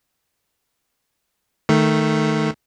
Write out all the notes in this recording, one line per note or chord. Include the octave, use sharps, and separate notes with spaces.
D#3 A3